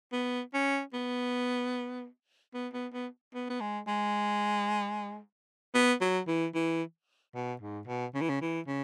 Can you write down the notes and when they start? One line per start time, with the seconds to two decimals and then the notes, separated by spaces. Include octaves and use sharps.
0.12 B3
0.54 C#4
0.93 B3
2.54 B3
2.73 B3
2.93 B3
3.34 B3
3.49 B3
3.60 G#3
3.87 G#3
5.74 B3
6.01 F#3
6.27 E3
6.54 E3
7.35 B2
7.61 G#2
7.87 B2
8.14 C#3
8.21 E3
8.29 C#3
8.41 E3
8.67 C#3